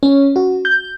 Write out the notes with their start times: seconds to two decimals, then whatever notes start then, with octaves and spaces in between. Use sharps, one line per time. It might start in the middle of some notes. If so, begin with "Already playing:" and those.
0.03 C#4
0.36 F#4
0.65 G6